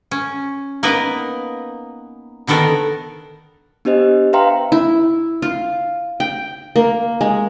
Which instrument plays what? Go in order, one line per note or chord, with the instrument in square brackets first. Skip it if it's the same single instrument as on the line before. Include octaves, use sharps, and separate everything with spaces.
[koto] C#4
A#3 B3 D#4 A#4 B4
D3 D#3 B3 A4 A#4
[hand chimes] B3 D4 G4 C5 D#5
B4 E5 F5 G5 A#5 C6
[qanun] E4
F4
G5
A#3
G#3